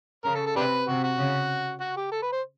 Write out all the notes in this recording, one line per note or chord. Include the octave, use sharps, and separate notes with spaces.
C#3 A#4
A4
A4
C3 D4 G4 B4
C3 F#4
F#4
C#3
F#4
G4
A4
B4
C5